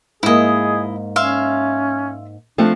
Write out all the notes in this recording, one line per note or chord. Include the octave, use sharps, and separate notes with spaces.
G#2 A#3 E4 G#4 D#5
C#4 E5 F5 C6
F3 A3 C4 D4